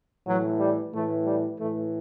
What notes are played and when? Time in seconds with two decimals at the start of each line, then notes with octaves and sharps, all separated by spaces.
0.26 A2 E3 F#3
0.60 G3
0.93 A2 E3 A3
1.26 G3
1.59 A2 E3 A3